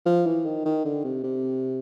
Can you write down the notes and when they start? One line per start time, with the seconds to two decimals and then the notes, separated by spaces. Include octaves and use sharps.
0.06 F3
0.26 E3
0.45 D#3
0.65 D#3
0.85 D3
1.04 C3
1.23 C3